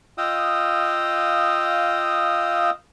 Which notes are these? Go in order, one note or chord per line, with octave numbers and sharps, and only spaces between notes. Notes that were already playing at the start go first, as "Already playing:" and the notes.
F4 D#5 F5 G5 D#6 E6